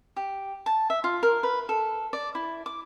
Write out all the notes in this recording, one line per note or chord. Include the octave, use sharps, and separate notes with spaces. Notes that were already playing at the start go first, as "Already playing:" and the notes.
G4
A5
E5
F4
A#4
B4
A4
D5
E4
D6